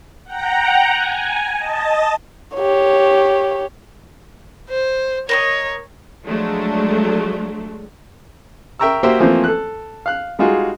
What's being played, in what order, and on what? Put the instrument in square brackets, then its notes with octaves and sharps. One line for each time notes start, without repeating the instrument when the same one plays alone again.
[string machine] F#5 G5 A#5
G#5
D#5 A5
[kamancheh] G4 C#5
C5
[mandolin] A#4 B4 D#5 [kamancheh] C#5
[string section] F3 F#3 G#3 A3 D4
[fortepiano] A#4 E5 G5 A#5 C#6 E6
A#3 F#4 G4 C5 E5 G5
E3 F3 A3 A#3 C4 C5
A4 F#6
F5 F#6
G3 G#3 D#4 F4 F#4 G#4